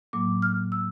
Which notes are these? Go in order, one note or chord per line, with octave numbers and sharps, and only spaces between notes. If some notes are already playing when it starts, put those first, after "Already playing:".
A2 F#3 A#3 D6
F6
E6